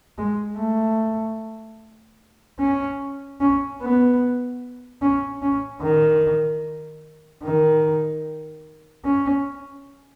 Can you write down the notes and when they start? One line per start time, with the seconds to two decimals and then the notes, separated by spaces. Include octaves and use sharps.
0.18 G#3
0.58 A3
2.60 C#4
3.40 C#4
3.81 B3
5.02 C#4
5.42 C#4
5.82 D#3
7.44 D#3
9.05 C#4